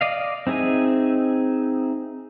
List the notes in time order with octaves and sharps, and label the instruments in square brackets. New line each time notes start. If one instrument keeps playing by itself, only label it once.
[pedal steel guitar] D5 D#5 F5
C4 D#4 G#4 E5 G#5